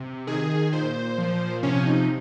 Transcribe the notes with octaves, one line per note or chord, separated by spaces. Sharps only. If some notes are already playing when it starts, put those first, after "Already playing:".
Already playing: C3
D#3 G#4
A#2 C5
F3
C3 C#4
D#4